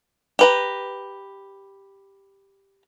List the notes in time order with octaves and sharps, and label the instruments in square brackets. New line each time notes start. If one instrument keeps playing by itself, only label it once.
[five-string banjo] G4 B4 A#5